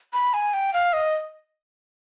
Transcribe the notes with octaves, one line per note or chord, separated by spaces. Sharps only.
B5
G#5
G5
F5
D#5